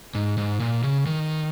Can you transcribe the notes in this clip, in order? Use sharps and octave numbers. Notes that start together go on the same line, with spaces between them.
G#2
G#2
A#2
C#3
D#3